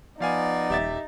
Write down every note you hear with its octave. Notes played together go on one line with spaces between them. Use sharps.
F3 B3 D#4 D5 F5 G#5
D#1 G4 E5 A6